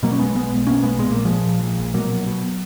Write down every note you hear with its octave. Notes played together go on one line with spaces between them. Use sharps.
B2 F#3 A#3
C#4
B1 G#3 B3
B2 G#3 B3
B1
B2 A#3 C#4
B1 G#3 B3
A#2 G#3
A#1 A#3
F3 G#3
A#2
A#1
A#2
A#1
B2 F#3 A#3
B1
B2